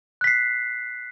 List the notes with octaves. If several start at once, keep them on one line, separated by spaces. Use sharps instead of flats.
F#6 B6 C7